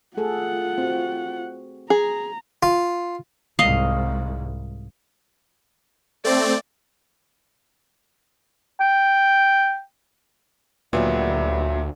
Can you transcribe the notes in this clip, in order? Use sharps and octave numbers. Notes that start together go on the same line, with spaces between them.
A3 F4 G#4 A4 F#5
C4 F#4
G#4 A#5
F4
C2 G#2 D#5 F5
A3 C4 D5
G5
D2 A#2 D#3 F#3 G3 B3 E5